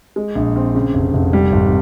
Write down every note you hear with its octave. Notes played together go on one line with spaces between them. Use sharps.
G#3
A#1
C4
C#3
F1
F1
G3
G#1